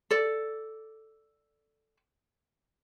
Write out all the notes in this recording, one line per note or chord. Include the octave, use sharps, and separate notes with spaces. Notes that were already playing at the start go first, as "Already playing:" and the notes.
A4 D5